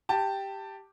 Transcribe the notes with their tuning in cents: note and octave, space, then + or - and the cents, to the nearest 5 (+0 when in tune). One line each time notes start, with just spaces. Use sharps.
G4 +0 A5 +15